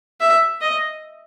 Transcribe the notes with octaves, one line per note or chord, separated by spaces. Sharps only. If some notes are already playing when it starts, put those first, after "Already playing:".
E5
D#5